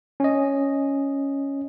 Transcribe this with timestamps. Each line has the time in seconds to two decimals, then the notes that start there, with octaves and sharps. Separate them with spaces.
0.20 C#4 D#5